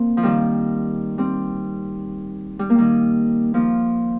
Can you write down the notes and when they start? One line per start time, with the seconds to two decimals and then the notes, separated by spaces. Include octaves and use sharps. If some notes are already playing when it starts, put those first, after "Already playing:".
Already playing: A#3 C4
0.17 F3
0.23 D#3 G3
1.18 G3 C4
2.59 G3
2.70 A#3
2.78 D#3 G3
3.54 F3 A#3